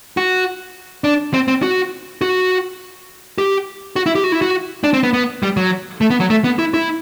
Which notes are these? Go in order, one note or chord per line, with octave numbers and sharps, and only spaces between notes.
F#4
D4
C4
C4
F#4
F#4
G4
F#4
E4
G4
F#4
E4
F#4
D4
C4
B3
B3
G3
F#3
A3
B3
F#3
A3
B3
E4
E4